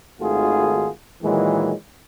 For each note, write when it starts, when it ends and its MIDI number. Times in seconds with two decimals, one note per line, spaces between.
0.21 0.89 32
0.21 0.89 51
0.21 0.89 57
0.21 0.89 65
0.21 0.89 66
0.21 0.89 68
1.23 1.73 46
1.23 1.73 51
1.23 1.73 52
1.23 1.73 54
1.23 1.73 56